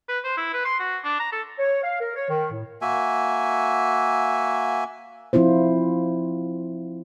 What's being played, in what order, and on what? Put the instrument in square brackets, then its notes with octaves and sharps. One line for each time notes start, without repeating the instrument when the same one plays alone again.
[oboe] B4
C5
E4
B4
C6
F#4
D4
A#5
A4
[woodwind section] C#5
F5
A#4
C#5
D#3
A2
[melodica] A#3 F#4 E5 G#5
[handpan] F3 C4 E4 F4 C5